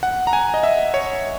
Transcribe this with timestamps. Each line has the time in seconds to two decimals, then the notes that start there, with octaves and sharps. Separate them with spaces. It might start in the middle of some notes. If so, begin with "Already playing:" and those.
0.03 F#5
0.27 A#5
0.33 G#5
0.54 D#5
0.63 E5
0.94 C#5